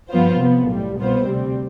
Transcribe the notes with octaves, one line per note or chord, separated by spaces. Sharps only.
G2 F3 B3 F4 C5
C3 F3 B3
B1 A2 G3
C2 B2 B3 F4 C5
D2 C3 G3 C4